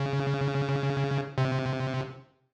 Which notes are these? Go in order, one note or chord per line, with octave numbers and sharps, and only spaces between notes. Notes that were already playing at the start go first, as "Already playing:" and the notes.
Already playing: C#3
C3